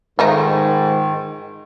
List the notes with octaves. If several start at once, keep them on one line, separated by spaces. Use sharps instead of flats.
G#2 D#3 F3 A3 D#4